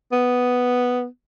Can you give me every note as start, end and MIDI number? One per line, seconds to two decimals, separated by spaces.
0.12 1.05 59